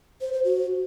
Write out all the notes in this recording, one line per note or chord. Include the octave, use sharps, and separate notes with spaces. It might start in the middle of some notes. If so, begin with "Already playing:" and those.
C5
C5
F#4